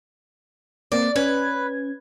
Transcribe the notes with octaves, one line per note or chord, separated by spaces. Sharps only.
A#3 C4 D5
C#4 B4 G#6